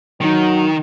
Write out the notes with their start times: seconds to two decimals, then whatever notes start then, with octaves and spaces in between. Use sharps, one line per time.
0.21 D#3 F#3 D#4